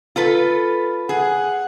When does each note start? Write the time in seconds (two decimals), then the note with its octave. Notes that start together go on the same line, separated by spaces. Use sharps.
0.16 F4 A4 B4
1.09 G#4 F#5